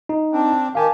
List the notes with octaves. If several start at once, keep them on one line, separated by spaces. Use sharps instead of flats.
D#4
C4 D4
D#3 G4 F5 G#5 A5